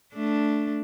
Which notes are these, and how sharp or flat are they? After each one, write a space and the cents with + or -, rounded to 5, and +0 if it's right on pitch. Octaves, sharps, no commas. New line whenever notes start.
A3 +0 D4 -5